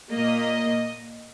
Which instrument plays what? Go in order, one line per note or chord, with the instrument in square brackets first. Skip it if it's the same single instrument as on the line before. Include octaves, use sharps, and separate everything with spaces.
[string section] A#2 A#3 D#5